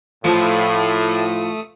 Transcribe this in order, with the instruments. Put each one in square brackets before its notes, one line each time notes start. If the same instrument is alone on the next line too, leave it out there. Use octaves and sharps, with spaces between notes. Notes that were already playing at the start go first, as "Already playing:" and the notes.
[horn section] A2 [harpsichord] F3 [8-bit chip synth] A3 D#6